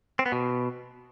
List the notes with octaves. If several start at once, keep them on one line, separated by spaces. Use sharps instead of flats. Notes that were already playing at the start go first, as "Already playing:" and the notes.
C4
B3
B2